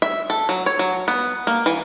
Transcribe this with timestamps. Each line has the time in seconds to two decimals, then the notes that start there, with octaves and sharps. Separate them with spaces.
0.02 E5
0.30 A4
0.49 F#3
0.66 C#5
0.79 F#3
1.08 B3
1.47 A#3
1.66 E3